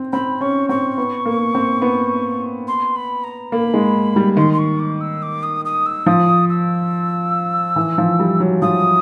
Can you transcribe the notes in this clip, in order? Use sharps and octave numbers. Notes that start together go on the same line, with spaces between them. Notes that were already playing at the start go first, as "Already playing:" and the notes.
Already playing: C4
C4 B5
C#4 C#6
C4 C#6
B3
A#3
C4
B3
C6
B5
A#5
A#3 B5
G#3
G3
D#3 C6
C6
C#6
D6
E6
D6
D#6
D#6
E6
F3 D#6
E6
E3
F3
G3
F#3
F3 D#6